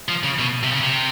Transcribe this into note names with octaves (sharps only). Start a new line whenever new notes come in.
F3
C#3
B2
C3
C#3
C3